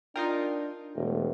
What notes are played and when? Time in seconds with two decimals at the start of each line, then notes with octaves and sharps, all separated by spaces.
0.16 D4 D#4 F4 A#4 G5
0.96 E1 A3